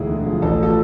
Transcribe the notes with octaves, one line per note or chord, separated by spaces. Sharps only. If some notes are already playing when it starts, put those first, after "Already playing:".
Already playing: E1 D2 E4 G#4
D3
F3
A1 A4
F4 A4